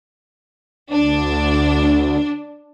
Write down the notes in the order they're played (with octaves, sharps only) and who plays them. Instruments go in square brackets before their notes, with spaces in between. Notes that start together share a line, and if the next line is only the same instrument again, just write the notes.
[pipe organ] D2 [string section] D4